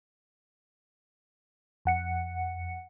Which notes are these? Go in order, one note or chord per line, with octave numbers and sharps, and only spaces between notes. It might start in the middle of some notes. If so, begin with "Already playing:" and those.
F2 F#5 C#7